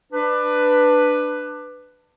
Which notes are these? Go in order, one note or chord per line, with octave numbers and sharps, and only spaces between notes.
D4 B4